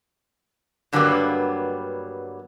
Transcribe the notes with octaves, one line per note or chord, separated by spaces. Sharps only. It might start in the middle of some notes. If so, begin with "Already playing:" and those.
G2 D3 F#3 G3 A#3 B3